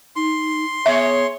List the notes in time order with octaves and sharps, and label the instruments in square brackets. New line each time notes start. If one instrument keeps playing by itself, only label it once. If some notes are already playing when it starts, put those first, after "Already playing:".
[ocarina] D#4 [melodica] C6
[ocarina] B3 [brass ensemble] G#4 C#5 [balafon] E5